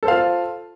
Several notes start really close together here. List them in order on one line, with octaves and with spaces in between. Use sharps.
A4 C5 F5 F4